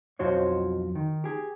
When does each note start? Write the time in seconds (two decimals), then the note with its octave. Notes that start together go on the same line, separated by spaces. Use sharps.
0.19 B1 F2 F3 F#4 C5 C#5
0.95 D#3
1.24 G4 G#4